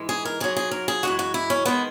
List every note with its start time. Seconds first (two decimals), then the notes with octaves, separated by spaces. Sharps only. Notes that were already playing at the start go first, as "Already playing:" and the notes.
Already playing: G#2 E3 G#3
0.09 G#4
0.25 A#4
0.40 G#2 F#3 G#4
0.57 G#4
0.71 A#4
0.88 G#4
1.03 F#2 E3 G#3 F#4
1.19 F#4
1.34 E4
1.50 C#4
1.66 D#3 G#3 B3